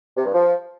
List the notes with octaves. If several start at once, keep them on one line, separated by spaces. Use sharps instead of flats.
C3
G2
F3